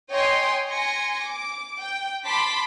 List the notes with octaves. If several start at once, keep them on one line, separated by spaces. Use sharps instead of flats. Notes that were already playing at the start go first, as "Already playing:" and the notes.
C#5 D#5 G5 G#5 C6
G#5 C6 A#6 C#7
D6
G5
A5 B5 C6 D6 B6